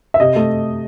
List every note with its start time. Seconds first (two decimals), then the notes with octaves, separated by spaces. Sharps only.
0.14 E5
0.20 C3 D#5
0.36 A3